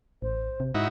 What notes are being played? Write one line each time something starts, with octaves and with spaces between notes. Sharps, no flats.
A1 C5
C3
G#2 D#4 E4 F#4